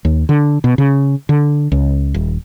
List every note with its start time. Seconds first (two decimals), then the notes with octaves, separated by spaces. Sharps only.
0.05 D#2
0.29 D3
0.64 B2
0.78 C#3
1.29 D3
1.72 C#2
2.14 D#1